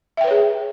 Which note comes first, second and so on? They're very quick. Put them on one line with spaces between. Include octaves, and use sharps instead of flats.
E5 G5 B4 C#5 G#4